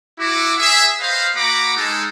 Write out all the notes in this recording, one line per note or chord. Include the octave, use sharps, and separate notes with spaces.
E4 F#4 D6
G#4 E5
B4 C5 D#5 F5
A#3 F#4 F#5 A#5 B5 D6
G#3 D#4 A4